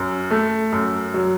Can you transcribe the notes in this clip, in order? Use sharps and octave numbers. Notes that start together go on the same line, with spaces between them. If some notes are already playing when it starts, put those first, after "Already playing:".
Already playing: F#2
A3
F#2
F#3